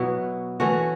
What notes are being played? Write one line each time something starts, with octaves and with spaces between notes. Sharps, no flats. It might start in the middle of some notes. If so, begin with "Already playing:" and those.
Already playing: B2 F#3 B3 E4
E3 A3 C#4 F#4